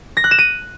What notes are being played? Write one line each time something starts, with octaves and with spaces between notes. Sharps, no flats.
A#6
F#6
E7
D#7